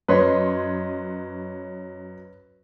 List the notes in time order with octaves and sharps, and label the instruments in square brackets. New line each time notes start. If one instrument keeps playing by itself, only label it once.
[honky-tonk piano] F#2 D#5 C6 [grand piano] B4 C#5